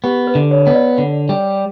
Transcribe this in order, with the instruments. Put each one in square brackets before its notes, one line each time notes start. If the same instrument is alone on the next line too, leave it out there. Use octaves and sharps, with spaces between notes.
[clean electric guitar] B3 [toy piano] G4
[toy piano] B4
[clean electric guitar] D3
[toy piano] C#5
[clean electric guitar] B3 [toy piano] C#5
[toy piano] D5
[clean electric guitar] D3 [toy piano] F#5
[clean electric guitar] G3